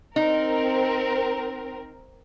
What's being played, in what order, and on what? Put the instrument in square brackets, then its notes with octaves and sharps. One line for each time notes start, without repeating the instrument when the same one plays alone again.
[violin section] C4 A#4 [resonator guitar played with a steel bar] D#4